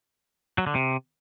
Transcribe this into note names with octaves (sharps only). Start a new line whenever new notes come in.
F#3
D3
C3